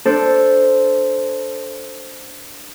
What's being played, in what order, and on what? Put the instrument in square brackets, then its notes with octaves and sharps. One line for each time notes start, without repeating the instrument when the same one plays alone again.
[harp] D4 A4 C5